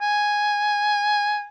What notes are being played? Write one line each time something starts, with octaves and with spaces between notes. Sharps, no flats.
G#5